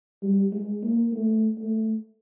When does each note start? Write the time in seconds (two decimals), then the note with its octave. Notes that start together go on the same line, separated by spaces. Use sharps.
0.23 G3
0.52 G#3
0.83 A#3
1.13 A3
1.58 A3